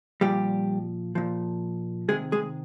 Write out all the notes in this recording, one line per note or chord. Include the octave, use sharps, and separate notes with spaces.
A#2 F3 G3 G4
A#2 F3
C3 D#3 G#3 G#4
G#3 G#4